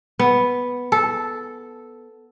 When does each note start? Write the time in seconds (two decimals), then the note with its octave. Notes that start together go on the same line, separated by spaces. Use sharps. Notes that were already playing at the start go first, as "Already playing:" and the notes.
0.19 B3
0.92 A4